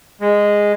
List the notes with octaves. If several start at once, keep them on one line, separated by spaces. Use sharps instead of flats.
G#3